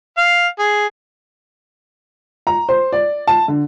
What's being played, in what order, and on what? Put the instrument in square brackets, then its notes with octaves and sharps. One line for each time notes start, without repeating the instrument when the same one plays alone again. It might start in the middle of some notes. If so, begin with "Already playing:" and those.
[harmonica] F5
G#4
[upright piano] A#5
C5
D5
A5
D3